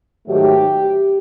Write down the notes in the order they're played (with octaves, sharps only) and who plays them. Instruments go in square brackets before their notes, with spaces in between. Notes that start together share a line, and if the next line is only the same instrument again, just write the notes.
[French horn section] G#2 D#3 F#3 A3 G4